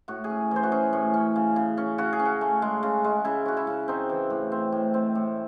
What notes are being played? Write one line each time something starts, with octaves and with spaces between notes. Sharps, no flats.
A2 F#4
G#4
C#4
E3 C5
F#4
C#4 G#4
A2
C#4
C#3
C#3
C#4
C#3 F#4
G#4
C#4
F#4
A3
G#3
C#3
G#3
C#3 E4
C#4 F#4
E4
C#3
C4 D#4
E3
A2
C4
A2
C4
A2